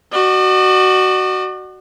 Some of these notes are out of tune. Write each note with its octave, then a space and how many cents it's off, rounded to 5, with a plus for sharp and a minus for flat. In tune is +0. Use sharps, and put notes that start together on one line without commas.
F#4 +15 D5 +45